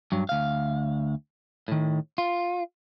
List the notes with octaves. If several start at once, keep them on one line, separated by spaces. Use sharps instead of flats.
G2 F#3
D2 F5
A2 D#3
F4